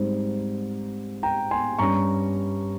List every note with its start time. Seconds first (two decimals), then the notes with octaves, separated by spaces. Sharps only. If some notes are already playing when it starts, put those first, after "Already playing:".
Already playing: G#2 G3 C4 D#4 C5
1.23 G5 A#5
1.51 G#5 C6
1.78 G2 G3 C#4 A#5 C#6